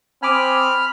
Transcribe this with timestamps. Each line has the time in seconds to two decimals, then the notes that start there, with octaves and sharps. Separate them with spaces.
0.23 C4 G#5 B5 D6 D#6 F6